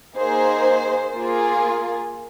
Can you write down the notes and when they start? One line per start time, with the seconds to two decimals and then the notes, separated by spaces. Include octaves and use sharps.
0.17 A#3 D#4 G#4 C5
1.14 A#3 F4 G#4